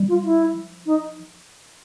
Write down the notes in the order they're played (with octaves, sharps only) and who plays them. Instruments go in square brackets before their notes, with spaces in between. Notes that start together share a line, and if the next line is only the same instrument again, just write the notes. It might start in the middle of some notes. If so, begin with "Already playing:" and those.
Already playing: [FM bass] G3
[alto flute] F4
E4
[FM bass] F3
[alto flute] D#4